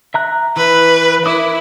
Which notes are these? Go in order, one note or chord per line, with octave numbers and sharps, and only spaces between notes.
E5 A#5 F#6
E3 B4
E4 A#4 D6 D#6